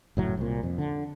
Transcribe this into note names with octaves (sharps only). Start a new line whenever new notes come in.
F#1 A2 F#3
C2 A#2
F2
D3